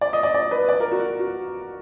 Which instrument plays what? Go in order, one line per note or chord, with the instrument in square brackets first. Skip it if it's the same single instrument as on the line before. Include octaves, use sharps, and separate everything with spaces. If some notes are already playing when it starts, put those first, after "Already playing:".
[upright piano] D5
D#5
D5
D5
B4
D5
A#4
F#4
F#4
F#4